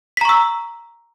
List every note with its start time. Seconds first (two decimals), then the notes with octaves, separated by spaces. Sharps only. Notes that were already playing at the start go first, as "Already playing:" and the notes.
0.17 B6
0.21 A#5
0.25 C#6
0.29 E6